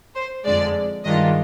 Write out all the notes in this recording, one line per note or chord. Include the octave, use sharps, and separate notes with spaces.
C5
F2 D3 G#3 D5
G2 D#3 G#3 D4 F4 D#5